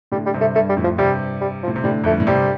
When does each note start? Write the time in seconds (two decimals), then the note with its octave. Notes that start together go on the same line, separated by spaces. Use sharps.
0.12 A2 D3 G3
0.26 G3
0.34 G2 C3
0.41 A3
0.55 G2 A3
0.69 G3
0.77 F2 A2
0.84 F3
0.98 G2 C3 G3
1.41 G3
1.63 F3
1.68 A2
1.76 C3
1.84 A2 D3 G3
2.04 F2 A3
2.11 G2
2.20 A2
2.27 G2 C3 G3